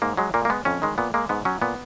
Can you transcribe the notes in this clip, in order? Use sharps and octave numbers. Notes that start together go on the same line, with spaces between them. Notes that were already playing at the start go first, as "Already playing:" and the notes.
G#2 A#3
F#3 G#3
A#2 A#3
A#3
G#3 B3
F2 C#4
D#3 G#3
A#2 B3
G#3 A#3
G#2 B3
F#3 C#4
A#2 B3